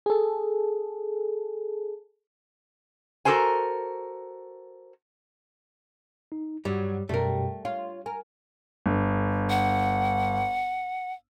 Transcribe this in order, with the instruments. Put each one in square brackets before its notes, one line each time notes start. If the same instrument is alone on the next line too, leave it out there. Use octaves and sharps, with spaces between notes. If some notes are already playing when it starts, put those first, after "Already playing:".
[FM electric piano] G#4 A4
[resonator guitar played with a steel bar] F#4 G4 A4 A#4 C5 G#5
[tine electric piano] D#4
[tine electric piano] G2 [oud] F#3 [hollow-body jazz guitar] G3
[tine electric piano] F#2 B2 [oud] G3 [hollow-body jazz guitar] A3 A#4
[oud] F4 [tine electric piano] C#5
[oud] A#4 [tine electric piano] G#5
[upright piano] G1
[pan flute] F#5